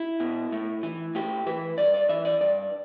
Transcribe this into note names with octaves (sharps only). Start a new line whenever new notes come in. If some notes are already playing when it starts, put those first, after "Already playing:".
Already playing: E4
B2
A2
E3
A2 G4
E3 B4
G2 D5
D5
E3 E5
D5
G2 D5